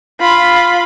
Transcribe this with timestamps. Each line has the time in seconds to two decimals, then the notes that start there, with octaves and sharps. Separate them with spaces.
0.20 F4 B5